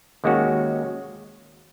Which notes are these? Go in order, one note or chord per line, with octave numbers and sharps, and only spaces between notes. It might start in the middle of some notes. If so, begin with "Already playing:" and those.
D#2 D#3 G#3 C#4 F#4